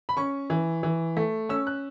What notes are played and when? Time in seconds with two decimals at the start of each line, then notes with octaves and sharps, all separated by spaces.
0.09 B5
0.17 C#4 C#6
0.50 E3
0.83 E3
1.17 A3
1.49 C#4 E6
1.67 F#6